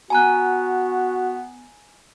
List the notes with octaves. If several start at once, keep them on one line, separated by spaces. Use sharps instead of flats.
B3 F#4 G#5 A#5 F#6